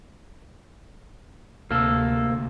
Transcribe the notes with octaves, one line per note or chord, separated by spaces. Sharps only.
D2 C3 A#3 A4 E6 F6